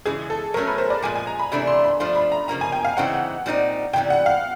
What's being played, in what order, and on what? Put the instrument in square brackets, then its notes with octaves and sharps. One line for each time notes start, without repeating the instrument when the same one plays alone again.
[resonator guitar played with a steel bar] C#3 E3 G#3 [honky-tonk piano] G#4
[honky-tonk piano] A4
[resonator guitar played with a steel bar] F#3 [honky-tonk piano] A#4
[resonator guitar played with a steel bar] A3 C#4
[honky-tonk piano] B4
C5
D5
[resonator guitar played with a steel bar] A#2 F3 G#3 [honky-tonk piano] G#5
[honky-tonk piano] G#5
A#5
B5
[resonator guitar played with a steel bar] C3 E3 A3 D4 [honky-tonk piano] B5
[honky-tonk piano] C6
B5
[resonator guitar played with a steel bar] F3 A3 D4 F4 [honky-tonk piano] C6
[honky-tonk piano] B5
A#5
[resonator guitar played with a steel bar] C#3 F3 A#3 [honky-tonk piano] A#5
[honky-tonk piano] G#5
G5
F5
[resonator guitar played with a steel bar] C#3 E3 G#3 C4 D#4 [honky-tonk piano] F#5
[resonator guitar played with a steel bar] A#2 G3 C4 D#4 G4
[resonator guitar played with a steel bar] C3 E3 G3 [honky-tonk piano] G5
[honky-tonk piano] F#5
F5